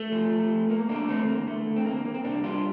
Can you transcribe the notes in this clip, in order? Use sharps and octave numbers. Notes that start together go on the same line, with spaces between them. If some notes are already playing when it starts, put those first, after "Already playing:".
Already playing: A3
F3
F3
F3
A3 A#3
A3 A#3 D4
E2 A3 C4
D3 A#3
E2 A3
D3
C4
E2 A#3
E2 A#3
C4
C2 A#3 D4
G3 D4 F4